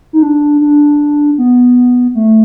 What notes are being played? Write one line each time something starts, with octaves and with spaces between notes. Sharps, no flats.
D#4
D4
D4
B3
A3